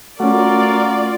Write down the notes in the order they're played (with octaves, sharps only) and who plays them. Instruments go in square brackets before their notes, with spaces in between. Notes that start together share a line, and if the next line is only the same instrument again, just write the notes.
[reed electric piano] A3 C#4 [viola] F4 D5 [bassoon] F#4 [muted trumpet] A#4